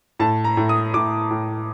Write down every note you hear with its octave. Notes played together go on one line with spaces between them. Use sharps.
A2 A5
A#5
A2
D#6
A2 D6
A2